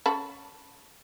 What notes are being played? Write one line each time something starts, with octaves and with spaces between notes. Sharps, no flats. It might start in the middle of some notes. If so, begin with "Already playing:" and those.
C#4 A4 B5